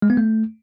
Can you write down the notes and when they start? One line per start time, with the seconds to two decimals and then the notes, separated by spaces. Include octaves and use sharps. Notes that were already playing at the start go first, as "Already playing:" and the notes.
0.02 G#3
0.10 B3
0.17 A3